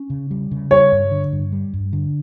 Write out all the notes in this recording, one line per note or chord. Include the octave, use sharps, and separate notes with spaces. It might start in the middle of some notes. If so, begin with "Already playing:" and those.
Already playing: C#4
C#3
G3
C#3
G3 C#5
G2
D3
G2
G3
G2
D3